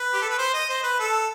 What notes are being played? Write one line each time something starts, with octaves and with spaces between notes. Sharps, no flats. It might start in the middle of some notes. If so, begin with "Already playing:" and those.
Already playing: B4
G4
A4
B4
C5
D#5
C5
B4
A4